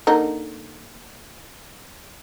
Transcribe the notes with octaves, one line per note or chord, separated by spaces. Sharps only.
D3 A#3 D#4